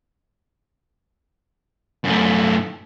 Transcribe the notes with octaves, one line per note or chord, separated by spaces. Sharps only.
F#2 A3